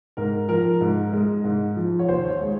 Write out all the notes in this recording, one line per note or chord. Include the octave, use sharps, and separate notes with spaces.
G#2 A#4
F3 A#4
G#2
G#3
G#2
F3
C#5
D#2 C5
C#5
G#3